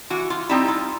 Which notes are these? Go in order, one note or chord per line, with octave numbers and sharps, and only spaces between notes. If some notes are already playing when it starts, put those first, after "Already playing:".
E3 F#4
F4
G3 C4 D#4 E4
F4